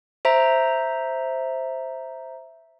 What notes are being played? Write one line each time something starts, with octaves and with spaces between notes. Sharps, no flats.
C5 E5 A#5